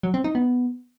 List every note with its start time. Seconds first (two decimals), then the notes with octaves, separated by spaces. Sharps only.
0.03 F#3
0.14 C4
0.24 D#4
0.35 B3